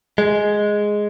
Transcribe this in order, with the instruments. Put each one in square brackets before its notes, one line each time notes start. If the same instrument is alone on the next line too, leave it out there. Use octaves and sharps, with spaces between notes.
[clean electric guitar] G#3